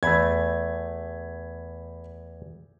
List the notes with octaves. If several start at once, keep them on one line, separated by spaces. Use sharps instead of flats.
E2 A3 B5 G#6